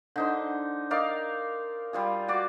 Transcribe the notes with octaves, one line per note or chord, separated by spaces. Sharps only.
D3 D#4 C5
D#4 A#4 D5 F5
G3 F4 G#4
F#4 D5 D6